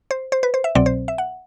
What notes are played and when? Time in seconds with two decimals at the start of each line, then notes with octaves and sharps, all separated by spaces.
0.11 C5
0.32 C5
0.43 B4
0.54 C5
0.64 E5
0.75 C2 B2 F#3 C4 D5
0.86 C5
1.08 E5
1.18 F#5